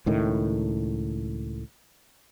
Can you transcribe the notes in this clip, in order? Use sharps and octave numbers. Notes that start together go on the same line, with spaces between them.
C#2 A2 D#3